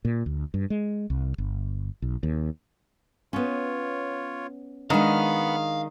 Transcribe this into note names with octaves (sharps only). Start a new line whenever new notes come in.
A#2
D2
G2
G#3
C2
G1
B1
D#2
B3 C#4 F4 C#5
D#3 G#3 B3 D4 F5 F#5 B5